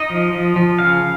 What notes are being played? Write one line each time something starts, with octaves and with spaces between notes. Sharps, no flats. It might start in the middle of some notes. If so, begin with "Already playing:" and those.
Already playing: D#4 D#5
F3
F3
F3
C#3 F5